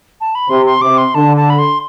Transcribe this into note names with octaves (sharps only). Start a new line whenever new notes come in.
A5
B5
C3 C6
C6
C3 D6
C6
D3 A5
A5
B5
C6